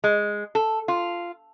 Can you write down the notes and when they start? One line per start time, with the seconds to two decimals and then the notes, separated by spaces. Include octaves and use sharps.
0.04 G#3
0.55 A4
0.88 F4